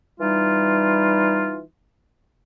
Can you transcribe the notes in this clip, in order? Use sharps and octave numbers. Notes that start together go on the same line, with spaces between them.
E3 G3 D#4 F4